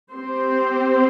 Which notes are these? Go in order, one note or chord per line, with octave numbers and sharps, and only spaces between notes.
C4 G4 C5